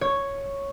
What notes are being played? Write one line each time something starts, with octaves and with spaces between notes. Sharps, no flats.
C#5